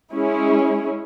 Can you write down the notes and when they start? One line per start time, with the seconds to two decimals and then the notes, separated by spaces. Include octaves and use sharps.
0.11 G#3 C#4 E4 G#4